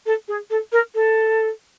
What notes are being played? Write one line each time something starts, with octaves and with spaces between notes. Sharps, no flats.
A4
G#4
A4
A#4
A4